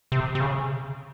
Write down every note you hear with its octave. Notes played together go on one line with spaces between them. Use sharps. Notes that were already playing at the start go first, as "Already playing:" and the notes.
C3
C3
C#3